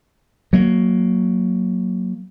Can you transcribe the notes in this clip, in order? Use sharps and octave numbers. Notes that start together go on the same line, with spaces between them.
F#3 A#3